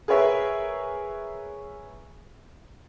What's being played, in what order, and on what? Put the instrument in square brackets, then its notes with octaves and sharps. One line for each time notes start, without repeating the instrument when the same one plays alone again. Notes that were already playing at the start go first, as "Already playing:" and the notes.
[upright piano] G#4 A#4 B4 C#5 E5